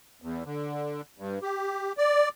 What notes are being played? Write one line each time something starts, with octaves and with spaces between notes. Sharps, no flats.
E2
D3
G2
G4
D5